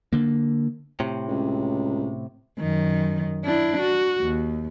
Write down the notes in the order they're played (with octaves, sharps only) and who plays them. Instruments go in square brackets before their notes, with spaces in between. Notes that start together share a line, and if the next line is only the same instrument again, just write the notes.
[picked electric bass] D3 A#3
[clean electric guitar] A2 C3
[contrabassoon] C#2
[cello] F#2 D#3
D4 E4
F#4
D#2